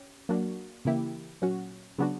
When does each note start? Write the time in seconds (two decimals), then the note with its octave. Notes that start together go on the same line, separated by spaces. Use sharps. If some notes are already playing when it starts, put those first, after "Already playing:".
Already playing: C#4 G4
0.29 F#3 A#3 D4 F#4
0.85 C#3 E3 A#3 E4 G4
1.42 A#2 F#3 C#4 F#4
1.98 C#3 F#3 B3 D4 F#4